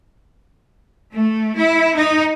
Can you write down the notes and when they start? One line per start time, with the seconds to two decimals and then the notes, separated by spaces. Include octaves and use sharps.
1.13 A3
1.58 E4
1.97 D#4